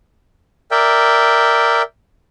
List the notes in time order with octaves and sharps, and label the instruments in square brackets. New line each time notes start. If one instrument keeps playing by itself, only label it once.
[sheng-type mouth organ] A#4 D5 E5 G5